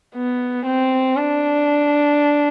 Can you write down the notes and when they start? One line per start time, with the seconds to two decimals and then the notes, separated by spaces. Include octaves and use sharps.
0.15 B3
0.66 C4
1.17 D4